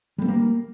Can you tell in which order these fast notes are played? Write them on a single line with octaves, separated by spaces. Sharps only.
G3 A3 C4 A#3